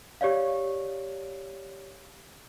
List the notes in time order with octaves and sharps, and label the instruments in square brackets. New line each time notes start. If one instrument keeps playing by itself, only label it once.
[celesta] G4 C#5 D5 F5